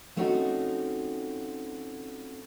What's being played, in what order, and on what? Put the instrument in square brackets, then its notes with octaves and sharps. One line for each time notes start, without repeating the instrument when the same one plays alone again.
[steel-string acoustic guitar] F3 A3 C4 C#4 D#4 F#4